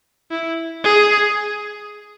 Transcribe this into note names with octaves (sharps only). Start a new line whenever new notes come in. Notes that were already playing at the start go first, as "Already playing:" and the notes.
E4
G#4